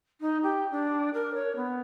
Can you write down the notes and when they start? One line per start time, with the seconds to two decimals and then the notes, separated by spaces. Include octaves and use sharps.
0.21 D#4
0.43 G4
0.71 D4
1.14 A#4
1.34 C#5
1.56 B3